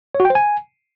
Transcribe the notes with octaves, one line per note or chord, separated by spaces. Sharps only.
C#5
F#4
G5
C5
G#5